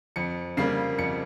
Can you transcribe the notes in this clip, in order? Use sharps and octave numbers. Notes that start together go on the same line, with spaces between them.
F2 C#7
C#3 G3 A#3 C7
F2 C#7